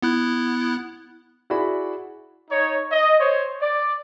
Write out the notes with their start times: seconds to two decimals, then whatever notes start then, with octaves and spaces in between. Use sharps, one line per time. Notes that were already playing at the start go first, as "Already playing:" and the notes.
0.02 B3 E4 F#6
1.50 E4 F#4 G#4 D5 B5
2.51 D#4 C#5
2.92 D#5
3.20 C5 C#5
3.62 D5